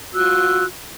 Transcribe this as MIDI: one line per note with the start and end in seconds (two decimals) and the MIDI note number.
0.14 0.65 65
0.14 0.65 66
0.14 0.65 88
0.14 0.65 90